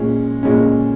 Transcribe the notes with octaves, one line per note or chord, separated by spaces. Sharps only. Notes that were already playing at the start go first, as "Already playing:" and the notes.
Already playing: A#2 G#3 C#4
A#2 G#3 C#4